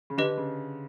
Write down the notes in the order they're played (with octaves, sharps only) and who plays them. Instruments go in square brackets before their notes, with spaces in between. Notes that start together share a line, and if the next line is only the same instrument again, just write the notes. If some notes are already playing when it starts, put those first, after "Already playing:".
[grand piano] C#3
[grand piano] D3 [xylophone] G4 B4 D#5
[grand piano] C#3